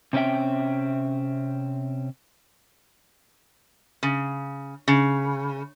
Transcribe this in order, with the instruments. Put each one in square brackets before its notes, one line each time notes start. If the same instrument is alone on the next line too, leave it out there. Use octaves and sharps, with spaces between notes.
[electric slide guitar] C3 C4 C#4 E5 G5
[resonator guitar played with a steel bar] C#3
C#3